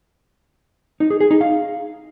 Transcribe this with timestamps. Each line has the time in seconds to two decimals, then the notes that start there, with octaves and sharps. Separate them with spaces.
1.00 D#4
1.10 G#4
1.20 G#4
1.31 D#4
1.41 F5